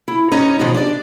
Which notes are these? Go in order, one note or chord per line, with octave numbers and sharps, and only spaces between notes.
E4
G2 C#4 D#4 C#5 D#5 A#5
G#2 B2 D#3 F3 G#3
D4 G4 D5